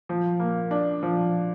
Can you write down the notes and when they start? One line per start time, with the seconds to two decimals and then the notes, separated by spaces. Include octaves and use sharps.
0.09 F3
0.40 A#3
0.71 D4
1.03 F3